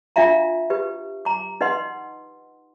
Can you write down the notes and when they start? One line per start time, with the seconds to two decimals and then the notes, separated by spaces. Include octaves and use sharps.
0.16 D4 F4 E5 F5 A#5
0.70 G4 B4
1.25 A#5 D6
1.61 D#4 B4 D#5 F#5 C6